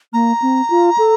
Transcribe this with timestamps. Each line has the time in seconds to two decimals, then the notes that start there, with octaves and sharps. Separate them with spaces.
0.13 A#3 A#5
0.42 C4
0.70 F4
0.98 A4